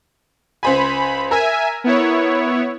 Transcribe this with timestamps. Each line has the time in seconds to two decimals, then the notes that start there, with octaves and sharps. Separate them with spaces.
0.63 C#2 C5 G#5 B5
1.31 A#4 E5 G#5
1.84 B3 E4 C#5